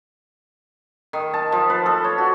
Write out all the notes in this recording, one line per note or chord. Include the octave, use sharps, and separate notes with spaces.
D#3
A5
F3
B4
A4
C#5
F#4